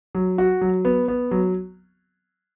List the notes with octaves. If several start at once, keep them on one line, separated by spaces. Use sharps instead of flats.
F#3
F#4
F#3
B3
B3
F#3